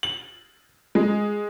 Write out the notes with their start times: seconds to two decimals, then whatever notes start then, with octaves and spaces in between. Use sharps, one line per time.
0.03 F#7
0.95 G#3